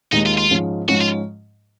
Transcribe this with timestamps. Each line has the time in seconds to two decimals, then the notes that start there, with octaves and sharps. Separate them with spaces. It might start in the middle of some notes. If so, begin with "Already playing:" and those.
0.12 D#2 D#3 G#3 D#4
0.26 F4
0.38 F4
0.51 G#2 F3 G#3 C#4
0.88 G#2 F3 G#3 C#4 F#4
1.01 F4